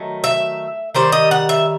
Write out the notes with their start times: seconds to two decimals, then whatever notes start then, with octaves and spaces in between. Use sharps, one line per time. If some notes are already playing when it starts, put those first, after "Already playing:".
Already playing: D#3 F#3 A3
0.24 E5
0.95 D#3 G3 C5
1.12 D#5
1.31 F#5
1.49 E5